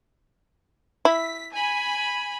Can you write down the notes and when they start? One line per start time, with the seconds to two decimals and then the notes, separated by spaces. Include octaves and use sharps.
1.05 E4 B6
1.52 G#5 B5